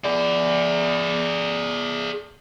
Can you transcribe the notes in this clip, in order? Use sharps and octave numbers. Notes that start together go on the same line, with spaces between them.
G#4 D5